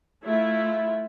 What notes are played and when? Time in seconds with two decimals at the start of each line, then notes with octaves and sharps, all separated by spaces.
0.24 A3 E4 F4